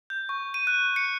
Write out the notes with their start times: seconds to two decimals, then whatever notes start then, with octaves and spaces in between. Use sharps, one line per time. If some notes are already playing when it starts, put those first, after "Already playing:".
0.10 G6
0.29 C#6
0.54 D#7
0.67 F#6
0.96 C#7